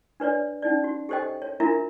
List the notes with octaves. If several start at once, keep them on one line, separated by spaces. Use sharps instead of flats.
D4 B4 C#5 D5
C#4 D#4 D5
F#4
G4 A4 C5 D#5 G5
C#5
D4 E4 F4 A#4 E5 A#5